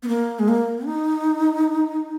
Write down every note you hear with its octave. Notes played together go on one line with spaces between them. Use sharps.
B3
A#3
G#3
A#3
D#4